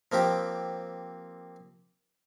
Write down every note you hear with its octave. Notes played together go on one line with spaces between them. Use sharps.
F3 A#3 C4 G4